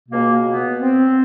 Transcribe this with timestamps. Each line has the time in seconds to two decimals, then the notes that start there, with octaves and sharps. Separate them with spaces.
0.09 C#2 B2 A#3
0.45 B3
0.80 C4